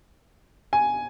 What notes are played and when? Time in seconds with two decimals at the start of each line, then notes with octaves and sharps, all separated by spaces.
0.73 G#5